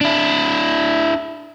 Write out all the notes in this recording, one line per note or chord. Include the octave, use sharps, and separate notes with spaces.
D4 E4